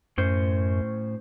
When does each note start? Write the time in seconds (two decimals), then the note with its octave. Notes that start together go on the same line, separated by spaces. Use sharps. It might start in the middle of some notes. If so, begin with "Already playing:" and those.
0.18 F#2 A2 C#4 C5